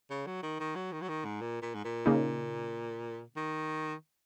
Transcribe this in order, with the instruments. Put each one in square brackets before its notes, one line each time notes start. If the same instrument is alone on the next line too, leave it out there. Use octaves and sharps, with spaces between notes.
[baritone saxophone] C#3
F#3
D#3
D#3
F#3
D#3
F#3
D#3
G#2
A#2
A#2
G#2
A#2
[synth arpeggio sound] C#3 A#3 D#4
[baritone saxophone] D#3